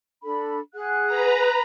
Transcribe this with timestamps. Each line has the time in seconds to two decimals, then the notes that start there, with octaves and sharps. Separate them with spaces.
0.24 D4 A4 B5
0.75 G#4 F#5 F#6
1.07 B4 A#5